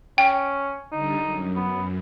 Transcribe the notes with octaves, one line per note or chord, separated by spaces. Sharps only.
C#4 G5
D3 G3 D#4
F#2
B3